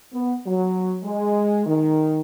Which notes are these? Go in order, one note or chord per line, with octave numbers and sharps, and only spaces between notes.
B3
F#3
G#3
D#3